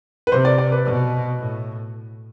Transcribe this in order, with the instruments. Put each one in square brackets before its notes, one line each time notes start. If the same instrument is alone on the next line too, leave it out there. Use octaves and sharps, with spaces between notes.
[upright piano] B4
[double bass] C3 [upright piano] C5
[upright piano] D5
D5
B4
[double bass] B2
A2